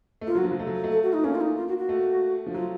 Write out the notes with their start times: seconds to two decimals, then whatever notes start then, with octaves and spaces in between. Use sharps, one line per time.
0.21 A3
0.27 A#3 F4
0.35 F#3
0.38 F#4
0.43 F3
0.52 F#3
0.59 A3
0.67 F#3
0.84 A3
0.92 A4
1.03 F#4
1.13 D#4
1.24 A#3 C#4
1.35 F4
1.41 D#4
1.57 F4
1.68 F#4
1.78 F#4
1.89 A3
2.47 F3
2.54 F#3 F4